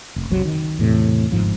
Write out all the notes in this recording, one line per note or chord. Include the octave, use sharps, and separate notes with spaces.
F1
F#1 C2 C3 F#3
D#3
E2 A2 C3
G1 G#2 F3